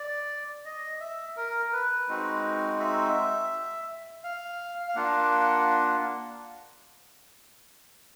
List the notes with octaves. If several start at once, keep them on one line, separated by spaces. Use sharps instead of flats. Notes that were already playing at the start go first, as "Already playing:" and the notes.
Already playing: D5
D#5
E5
A#4
B4
G#3 C4 D#4 F#4
E5
F5
F5
A#3 D4 F4 F#5